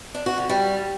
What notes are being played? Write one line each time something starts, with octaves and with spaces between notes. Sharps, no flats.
D4
F#4
D3
G3